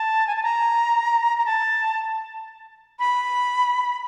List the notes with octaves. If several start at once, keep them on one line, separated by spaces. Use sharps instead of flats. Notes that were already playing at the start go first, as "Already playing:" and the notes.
Already playing: A5
G#5
A5
A#5
A#5
A5
B5